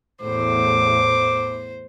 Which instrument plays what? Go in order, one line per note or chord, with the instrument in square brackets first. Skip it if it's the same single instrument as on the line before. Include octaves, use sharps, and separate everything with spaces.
[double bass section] E2 A2 [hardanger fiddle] C5 [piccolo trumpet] D6